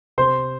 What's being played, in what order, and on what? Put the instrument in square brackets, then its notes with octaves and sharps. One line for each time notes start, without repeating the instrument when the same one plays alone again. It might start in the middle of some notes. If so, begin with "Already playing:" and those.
[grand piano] C3 C5 C6